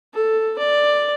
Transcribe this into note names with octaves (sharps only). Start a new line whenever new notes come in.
A4
D5